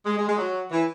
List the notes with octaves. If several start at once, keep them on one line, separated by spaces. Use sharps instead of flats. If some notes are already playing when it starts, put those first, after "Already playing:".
G#3
G#3
G#3
F#3
E3